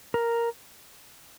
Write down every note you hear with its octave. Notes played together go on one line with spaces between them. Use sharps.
A#4